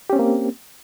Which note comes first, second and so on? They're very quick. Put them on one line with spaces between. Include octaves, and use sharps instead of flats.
G4 C#4 C4 A#3